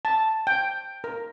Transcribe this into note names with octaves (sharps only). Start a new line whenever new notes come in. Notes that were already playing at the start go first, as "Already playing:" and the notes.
A5
G5
A#4